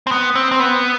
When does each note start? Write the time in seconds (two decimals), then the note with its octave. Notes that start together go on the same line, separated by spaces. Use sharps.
0.07 C4
0.11 B3
0.36 C4
0.51 C4
0.60 B3